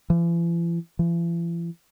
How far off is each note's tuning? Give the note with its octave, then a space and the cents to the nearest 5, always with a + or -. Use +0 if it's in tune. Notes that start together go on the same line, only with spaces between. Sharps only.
E3 +45
E3 +45